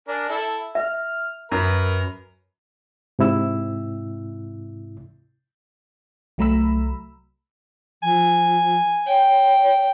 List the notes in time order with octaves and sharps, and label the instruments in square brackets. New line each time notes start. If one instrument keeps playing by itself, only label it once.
[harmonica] D4 A#4 G#5
E4 A4
[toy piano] E5 [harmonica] F6
[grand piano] F#2 [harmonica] A#4 B4 A#5
[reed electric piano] G#2 C3 E4 E6
[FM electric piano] C2 F#3 A3 A#5 B5 E6
[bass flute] F3 [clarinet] G#5
[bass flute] C#5 [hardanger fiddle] G5